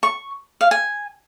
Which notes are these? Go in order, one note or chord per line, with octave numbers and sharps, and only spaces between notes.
C#6
F5
G#5